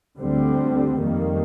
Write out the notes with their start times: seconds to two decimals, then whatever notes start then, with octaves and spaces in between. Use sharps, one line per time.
0.19 D2 D3 G3 C4
0.99 F2 D#3 G3 A#3